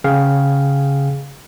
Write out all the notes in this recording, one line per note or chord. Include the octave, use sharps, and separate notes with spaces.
C#3 G#4 F5 G5